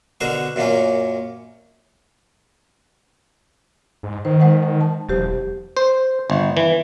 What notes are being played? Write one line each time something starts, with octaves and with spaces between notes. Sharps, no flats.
B2 D3 A#4 C5 F#5 C#6
F#2 A#2 A#3 C#4
G#2
D#3 C5
G#3 C5 F#5
A5
E1 F#3 G4 C5
C5
G1
E3